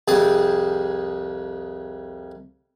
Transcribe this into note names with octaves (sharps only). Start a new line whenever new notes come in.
C2 F2 G#4 A5 D#6